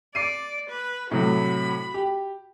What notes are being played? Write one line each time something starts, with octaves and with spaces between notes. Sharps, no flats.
D5 D6 C7 D#7
B4
A2 C3 F#3 F#4 B5
G4